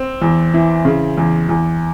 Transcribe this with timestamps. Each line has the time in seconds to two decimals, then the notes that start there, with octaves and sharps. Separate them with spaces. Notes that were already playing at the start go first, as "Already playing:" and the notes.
Already playing: C4
0.22 E2
0.54 E3
0.85 C#3
1.17 E2
1.49 E2